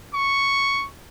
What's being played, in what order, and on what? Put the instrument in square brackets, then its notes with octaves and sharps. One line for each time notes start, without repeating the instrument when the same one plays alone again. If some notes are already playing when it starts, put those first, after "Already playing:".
[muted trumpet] C#6